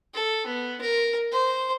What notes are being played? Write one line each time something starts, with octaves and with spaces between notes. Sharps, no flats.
A4
B3
A#4
C5